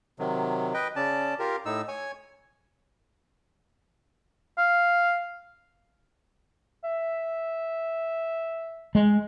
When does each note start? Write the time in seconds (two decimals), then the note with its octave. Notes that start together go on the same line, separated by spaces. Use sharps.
0.19 C3 D#3 F#3
0.74 B4 D#5 G5
0.96 C#3 C#4 D5 A5
1.39 F4 G4 A#4
1.66 A2 D#4 E6
1.88 C#5 G#5
4.58 F5
6.84 E5
8.95 G#3